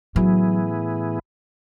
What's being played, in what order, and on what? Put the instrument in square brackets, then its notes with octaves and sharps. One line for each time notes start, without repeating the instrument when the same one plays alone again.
[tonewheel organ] A2 E3 B3 E4 G#4 [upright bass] F#3